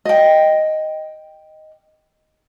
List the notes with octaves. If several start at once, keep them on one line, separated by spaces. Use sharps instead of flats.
D#5 G5